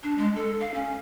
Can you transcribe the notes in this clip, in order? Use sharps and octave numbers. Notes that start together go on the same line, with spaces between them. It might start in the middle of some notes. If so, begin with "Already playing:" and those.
D4
G#3
A4
F5
C#4